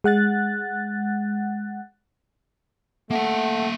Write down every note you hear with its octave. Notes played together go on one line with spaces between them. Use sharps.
G#3 F#5 F#6 A6
A3 A#3 E5 F#5